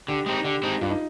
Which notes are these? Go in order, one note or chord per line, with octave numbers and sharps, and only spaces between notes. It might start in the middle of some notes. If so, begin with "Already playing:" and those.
D3 G4
G#3 C4 D#4
D3 G4
G#3 C4 D#4
G2 F4
D#4